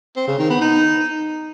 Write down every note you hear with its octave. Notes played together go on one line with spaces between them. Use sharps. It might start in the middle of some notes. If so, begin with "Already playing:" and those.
C4
C#3
D#3
B3
D#4